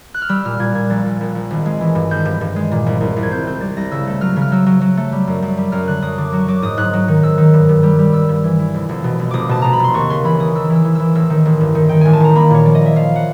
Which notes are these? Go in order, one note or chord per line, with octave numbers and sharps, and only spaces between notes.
F#6
F6
G3 E6
A#2 F6
A#2 G#6
A#2 G#6
A#1 A6
A#1
A#1
A#1
G#1
G#3
E3
G2
G#1 G6
G2
G2
G#3
A#2
C2
C2
C2
G#6
C4 G6
C4 G6
G3 A6
C2 A#6
C#3 E6
A3
F#3 F6
C#3
F6
F#3 E6
F#3
F#3
A3
G3
F#2
F#2
G3
F#2 F6
D3 F#6
F#2 D#6
D3 D6
F#3 C#6
F#3 D6
G#2 D#6
G#2 F#6
F#3
D#3
G#2 E6
D#3
G2
G2
G3
G3
G2 E6
G2
E3
E3
F1
F1
B2
F1
F1 D6 D#6
B2 A5
B2 A#5
B5
F1 C6
D#2 C#6
C#3 C6
E3 B5
E3 D#6
D#2 E6
E3
E6
E3
E3 E6
A1 E6
D#3
A1
G2
D#3
D#3 G5
A1 G#5
A5
D#3 A#5
A#3 B5
A#2 C#5
F3 D5
D#5
A#3 E5
F3 F5
F#5